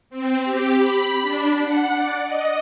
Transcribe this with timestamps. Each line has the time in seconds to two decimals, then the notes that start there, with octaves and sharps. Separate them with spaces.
0.10 C4
0.44 G4
0.77 B5
1.22 D4
1.63 F#5
1.94 D5
2.25 D#5